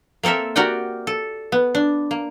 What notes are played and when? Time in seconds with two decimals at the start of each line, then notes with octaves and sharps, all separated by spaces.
0.23 A#3 C4 A4 A#4 E5
0.56 F#4 G4 A#4 D5 F#5 G5
1.07 A4
1.52 B3
1.75 D4
2.11 A#3